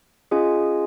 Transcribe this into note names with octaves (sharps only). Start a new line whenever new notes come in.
C#4 F4 G#4 D#5 G#5